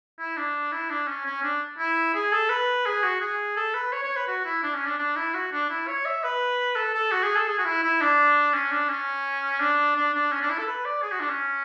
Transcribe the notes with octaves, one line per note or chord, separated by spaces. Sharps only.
E4
D4
E4
D4
C#4
C#4
D4
E4
G#4
A4
B4
G#4
F#4
G#4
A4
B4
C#5
C#5
B4
F#4
E4
D4
C#4
D4
D4
E4
F#4
D4
E4
C#5
E5
B4
A4
A4
F#4
G#4
A4
G#4
F#4
E4
E4
D4
C#4
D4
C#4
D4
D4
D4
C#4
D4
E4
A4
B4
D5
G#4
F#4
D4
C#4